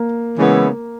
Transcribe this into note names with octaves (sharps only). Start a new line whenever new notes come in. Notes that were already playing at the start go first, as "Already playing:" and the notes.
Already playing: A#3
C#3 E3 G#3 B3 E4